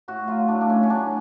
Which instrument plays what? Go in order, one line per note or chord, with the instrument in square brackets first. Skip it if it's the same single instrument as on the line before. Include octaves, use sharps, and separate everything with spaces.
[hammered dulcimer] A2 F#4
F#3 F4
A2 D4
D4
A3 C#4
C#4
F#3 D4